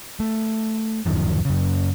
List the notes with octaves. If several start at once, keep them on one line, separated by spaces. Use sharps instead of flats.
A3
D1 F#2 D#3 F3
F#2 C#3